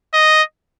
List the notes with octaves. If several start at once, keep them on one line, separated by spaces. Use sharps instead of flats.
D#5